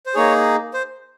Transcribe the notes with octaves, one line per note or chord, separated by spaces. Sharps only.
C5
A#3 D#4 G#4 C#5
C5